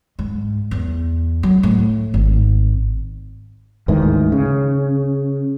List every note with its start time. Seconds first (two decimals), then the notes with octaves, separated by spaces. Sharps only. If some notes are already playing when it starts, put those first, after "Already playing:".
0.19 G#2
0.71 E2
1.43 F#3
1.63 A2
2.14 G#1
3.88 D2 G#2 D#3 E3
4.32 C#3